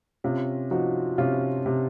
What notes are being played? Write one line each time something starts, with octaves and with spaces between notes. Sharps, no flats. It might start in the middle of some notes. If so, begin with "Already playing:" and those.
C3 C#4 F4
F3 D#4 F#4
C3 C#4 F4
C3